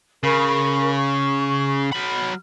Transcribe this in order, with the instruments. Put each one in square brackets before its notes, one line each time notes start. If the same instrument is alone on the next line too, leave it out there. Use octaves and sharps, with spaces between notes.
[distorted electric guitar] C#3 [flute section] A#4 B5 C#6
[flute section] C#6
[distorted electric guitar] F#3 B5 [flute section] F6